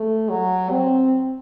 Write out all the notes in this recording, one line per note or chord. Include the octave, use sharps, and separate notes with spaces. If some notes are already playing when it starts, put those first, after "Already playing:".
Already playing: A3
F#3
C4